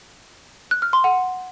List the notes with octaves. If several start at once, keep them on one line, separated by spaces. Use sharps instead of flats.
F#6
F6
C6
F#5